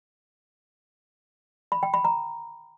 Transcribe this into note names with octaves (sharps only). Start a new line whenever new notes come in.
B5
G5
B5
A#5